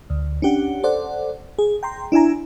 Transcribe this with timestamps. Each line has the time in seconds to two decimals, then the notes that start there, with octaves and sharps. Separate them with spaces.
0.10 D2
0.42 C#4 D4 G4 F#5
0.83 A4 C5 D5 F#5
1.58 G#4
1.83 G5 A#5 C6
2.12 D4 E4 E5 G#5 A#5